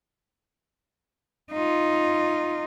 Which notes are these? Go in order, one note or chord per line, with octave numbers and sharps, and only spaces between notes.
D#4 F4